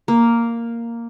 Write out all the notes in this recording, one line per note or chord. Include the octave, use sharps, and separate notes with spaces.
A#3